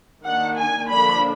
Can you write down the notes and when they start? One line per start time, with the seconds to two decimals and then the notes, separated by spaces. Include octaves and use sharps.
0.23 D#3 A#3 D4 F#5
0.56 G#5
0.88 D3 F3 A#3 D4 B5